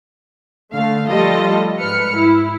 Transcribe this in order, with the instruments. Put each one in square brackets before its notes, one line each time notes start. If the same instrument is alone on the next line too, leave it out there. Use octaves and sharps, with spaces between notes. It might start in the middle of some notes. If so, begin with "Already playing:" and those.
[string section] D3 A3 F5
F3 G3 A3 F4 A4 D#5
G#2 B4 F6 C#7
E4